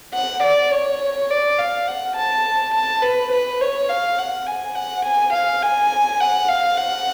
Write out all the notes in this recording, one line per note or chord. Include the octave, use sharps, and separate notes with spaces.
F#5
D5
C#5
D5
F5
F#5
A5
A5
B4
B4
C#5
F5
F#5
G#5
F#5
G#5
F5
G#5
F#5
F5
F#5